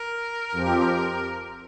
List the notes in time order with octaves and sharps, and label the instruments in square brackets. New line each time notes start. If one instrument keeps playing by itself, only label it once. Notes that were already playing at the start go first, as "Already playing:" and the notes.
Already playing: [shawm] A#4
[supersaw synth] F2 F3 C4 G4